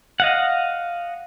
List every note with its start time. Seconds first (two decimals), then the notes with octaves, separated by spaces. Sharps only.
0.20 D#5 F5 F#5